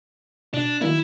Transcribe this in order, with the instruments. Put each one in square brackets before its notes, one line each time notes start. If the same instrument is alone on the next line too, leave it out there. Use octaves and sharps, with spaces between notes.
[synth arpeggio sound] B2 [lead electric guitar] D4
[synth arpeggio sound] D#3 F#3 A#3 [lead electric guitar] E4